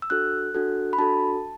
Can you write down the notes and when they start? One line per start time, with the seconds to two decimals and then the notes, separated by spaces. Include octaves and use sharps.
0.02 E6
0.10 D4 F#4 A4 F#6
0.54 D4 F#4 A4
0.93 B5
0.98 D4 F#4 A4 A5